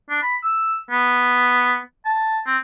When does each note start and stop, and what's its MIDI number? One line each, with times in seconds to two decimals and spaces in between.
0.10 0.20 62
0.23 0.37 83
0.44 0.79 88
0.91 1.79 59
2.06 2.39 81
2.47 2.58 60